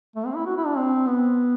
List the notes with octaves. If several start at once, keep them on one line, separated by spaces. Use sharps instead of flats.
A3
C4
E4
F#4
E4
D4
C4
B3